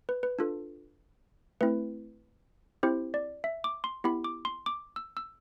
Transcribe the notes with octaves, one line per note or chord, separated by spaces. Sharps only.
B4
B4
D4 F4 A4
A3 C4 E4 B4
C4 E4 G4 C5
D5
E5
D6
C6
B3 E4 G4 B5
D6
C6
D6
E6
E6